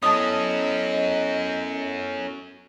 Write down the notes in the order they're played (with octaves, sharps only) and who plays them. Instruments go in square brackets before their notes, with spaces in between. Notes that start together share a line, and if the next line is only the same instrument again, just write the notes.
[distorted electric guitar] F#3 C#4 [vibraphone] B3 E4 A4 [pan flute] D#5 [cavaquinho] A5 D#6